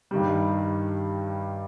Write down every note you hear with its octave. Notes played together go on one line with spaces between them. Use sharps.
G2 D#3 G3